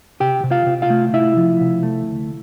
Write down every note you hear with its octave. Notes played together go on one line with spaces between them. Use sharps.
C3 G4 G5
C3
F4 F5
C3
F4 F5
A3
C3 E4 E5
F3
C3
A3
D2